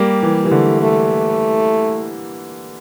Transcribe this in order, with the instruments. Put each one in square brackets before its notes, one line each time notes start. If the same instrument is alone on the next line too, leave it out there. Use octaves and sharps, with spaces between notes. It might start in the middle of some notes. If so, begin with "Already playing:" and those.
Already playing: [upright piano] G3 A#3 [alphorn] G4
[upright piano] E3
E3
[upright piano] D3 [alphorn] A3
[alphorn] A3